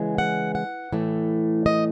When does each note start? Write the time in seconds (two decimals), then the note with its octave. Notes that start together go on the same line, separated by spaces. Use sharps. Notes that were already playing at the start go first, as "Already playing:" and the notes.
Already playing: C#3 E3 G#3
0.18 F#5
0.55 F#5
0.93 A2 E3 A3
1.66 D#5